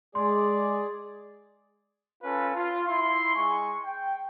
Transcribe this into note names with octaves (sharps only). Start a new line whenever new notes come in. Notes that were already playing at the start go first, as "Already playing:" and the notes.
G#3 G#4 D5 C6
C#4 F4 A4 B4 F5
F4
E4 C6
G#3 G#5 C#6
G5